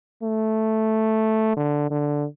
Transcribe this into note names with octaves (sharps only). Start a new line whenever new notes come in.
A3
D3
D3